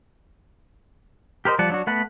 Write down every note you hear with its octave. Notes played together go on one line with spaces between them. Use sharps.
G4 A#4 C5 D#5
F3 G3 D5 F#5 A5
F#3 D4 F#4
A3 B3 F#5 A5 B5